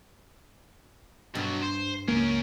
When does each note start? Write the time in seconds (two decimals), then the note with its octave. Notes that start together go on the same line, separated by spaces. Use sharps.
1.35 G2 B2 F#3
1.63 C5
2.08 C#2 A#3 C#4 A#4